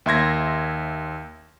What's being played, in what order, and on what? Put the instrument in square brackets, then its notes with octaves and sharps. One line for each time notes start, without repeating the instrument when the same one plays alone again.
[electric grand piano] D#2 E5 C6 G#6 A#6